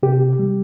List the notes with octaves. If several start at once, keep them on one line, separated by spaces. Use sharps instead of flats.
C3 G4
G3